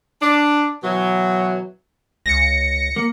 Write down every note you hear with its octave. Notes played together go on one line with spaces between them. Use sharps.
D4
B2 E3 F#3
C#2 A#6 C#7
A#3